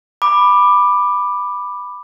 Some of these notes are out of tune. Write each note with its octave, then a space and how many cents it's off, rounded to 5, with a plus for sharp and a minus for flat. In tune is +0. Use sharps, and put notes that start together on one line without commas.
B5 +0 D6 +10